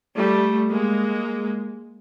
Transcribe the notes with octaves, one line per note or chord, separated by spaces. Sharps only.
G3 A3
G#3 A#3